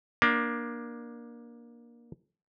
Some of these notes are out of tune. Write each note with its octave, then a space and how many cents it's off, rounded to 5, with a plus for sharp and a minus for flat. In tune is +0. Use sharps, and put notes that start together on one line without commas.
A#3 +20 D4 +15